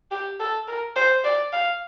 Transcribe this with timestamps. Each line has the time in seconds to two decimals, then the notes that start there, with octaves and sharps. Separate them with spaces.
0.11 G4
0.40 A4
0.68 A#4
0.96 C5
1.24 D5
1.53 F5